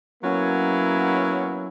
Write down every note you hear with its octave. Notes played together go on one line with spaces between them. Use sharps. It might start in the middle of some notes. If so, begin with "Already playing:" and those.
F#3 A#3 B3 C#4 E4